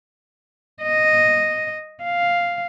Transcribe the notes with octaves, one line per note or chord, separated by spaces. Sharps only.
D#5
F5